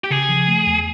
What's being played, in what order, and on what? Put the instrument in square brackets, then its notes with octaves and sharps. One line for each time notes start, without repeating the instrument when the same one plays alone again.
[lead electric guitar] G4
[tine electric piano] C#3 [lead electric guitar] G#4
[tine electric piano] F3
A3
E2